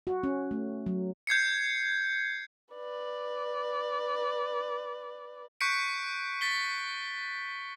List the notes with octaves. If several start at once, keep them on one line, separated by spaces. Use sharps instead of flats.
F#4
C#4
A3
F#3
G6 G#6 C7 C#7
B4 D5
C#6 F#6 G6 B6 C#7 D7
A6 B6 G7